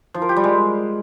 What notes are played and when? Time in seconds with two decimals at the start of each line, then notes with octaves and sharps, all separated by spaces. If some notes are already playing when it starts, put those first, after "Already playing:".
0.14 F3
0.22 A#4
0.29 G4
0.36 G3
0.44 G#3